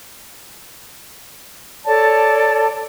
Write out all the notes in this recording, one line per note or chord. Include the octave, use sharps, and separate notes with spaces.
A4 C#5 D5 A5